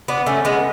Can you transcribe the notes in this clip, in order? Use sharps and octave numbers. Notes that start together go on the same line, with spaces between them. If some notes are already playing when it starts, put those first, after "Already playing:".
B3 D4
A3 C#4
G#3 B3